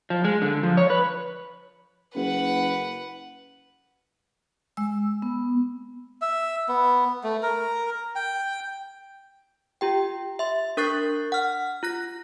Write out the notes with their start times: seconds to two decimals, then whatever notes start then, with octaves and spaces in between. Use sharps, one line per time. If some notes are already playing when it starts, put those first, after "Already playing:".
0.10 F3
0.24 G#3
0.42 D3
0.63 F3
0.77 C#5
0.90 B4
2.15 F#1 B4 F#5
4.77 G#3 E6
5.22 B3
6.21 E5
6.68 B3
7.24 A3
7.43 A#4
8.16 G5
9.81 F4 G4 G5
10.39 E5 C6
10.77 D4 A#4 C#6 F#6 A6 C7
11.32 F#5 F6
11.83 F4 F#6 A#6